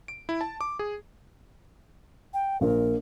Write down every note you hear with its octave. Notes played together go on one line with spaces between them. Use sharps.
D7
E4
A5
D6
G#4
G5
A#1 A#2 A#4